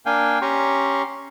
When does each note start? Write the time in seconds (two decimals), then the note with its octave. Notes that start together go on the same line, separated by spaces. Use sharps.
0.06 A#3 D4 F5 G5 G#5
0.42 C#4 G4 A#5 C6 C#6